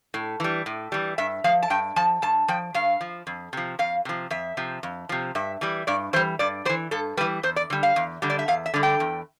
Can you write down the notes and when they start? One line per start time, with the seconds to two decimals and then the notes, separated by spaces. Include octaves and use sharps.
0.14 A2
0.40 E3 G3
0.66 A2
0.92 E3 G3
1.18 G2 E5
1.44 F3 F5
1.63 A5
1.70 G2 G5
1.96 F3 A5
2.22 G2 A5
2.48 F3 G5
2.74 G2 F5
3.01 F3
3.27 F2
3.53 C3 F3
3.79 F2 F5
4.05 C3 F3
4.31 F2 E5
4.57 C3 F3
4.83 F2
5.09 C3 F3
5.35 G2 E5
5.61 E3 G3
5.87 G2 D5
6.13 E3 C5
6.16 G3
6.39 G2 D5
6.65 G3 C5
6.69 E3
6.91 G2 A4
7.17 G3 B4
7.21 E3
7.43 E2 C5
7.56 D5
7.70 D3 G3
7.83 F5
7.96 E2
8.22 D3 G3
8.30 D5
8.39 E5
8.48 E2 F5
8.66 E5
8.74 D3 G3
8.83 G5
9.00 E2